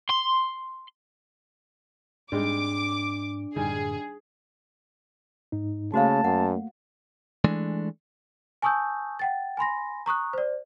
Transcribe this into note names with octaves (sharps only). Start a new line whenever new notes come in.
C6
G#2 G3 G#3 C4 D4 D#4 D6
F#2 A2 D3 D#3 G3 G#4
G#2 D#4
C#3 A3 A#3 F#4 C5 F5 A5
F#2 F#5
E3 G#3 A3 D4
G#5 A5 C#6 D#6 E6 G6
F#5 G5 A6
G#5 B5 C6 A#6
A#5 C#6 D#6 F#6
C5 D5